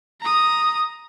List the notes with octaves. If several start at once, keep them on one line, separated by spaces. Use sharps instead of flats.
A#5 D#6